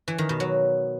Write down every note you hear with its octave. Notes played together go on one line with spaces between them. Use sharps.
E3
D#3
B2
F#3